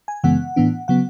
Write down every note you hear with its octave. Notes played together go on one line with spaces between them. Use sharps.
G#5
F#2 C#3 E3 G#3 B3 F#5
A2 E3 B3 D4
C#3 F#3 B3 F#5